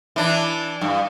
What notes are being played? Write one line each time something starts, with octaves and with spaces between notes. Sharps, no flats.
E3 D4
G2